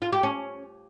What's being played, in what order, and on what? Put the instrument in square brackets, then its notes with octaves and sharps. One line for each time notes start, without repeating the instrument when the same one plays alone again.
[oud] F4
G4
C#4